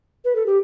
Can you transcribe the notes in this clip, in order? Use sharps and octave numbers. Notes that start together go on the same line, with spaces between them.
B4
A4
G4